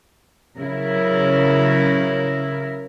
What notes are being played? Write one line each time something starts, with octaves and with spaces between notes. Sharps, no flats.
C#3 F#3 E4 A#4